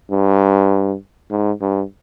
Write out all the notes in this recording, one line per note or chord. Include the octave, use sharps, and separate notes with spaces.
G2
G#2
G2